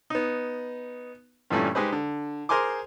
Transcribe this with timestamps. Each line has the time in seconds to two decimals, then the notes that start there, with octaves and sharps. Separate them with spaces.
0.10 B3 D#4
1.50 G2 A#2 E3 G3 A3 C#4
1.75 G#3 D#4 G4 G#4 B4 C5
1.92 D3
2.49 G#4 A#4 C5 G#5 C6 D6